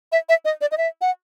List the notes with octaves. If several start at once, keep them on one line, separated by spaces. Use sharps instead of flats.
E5
E5
D#5
D5
D#5
E5
F#5